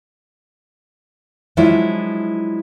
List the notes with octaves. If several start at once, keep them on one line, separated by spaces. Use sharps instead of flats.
F3 F#3 G#3 D4 E4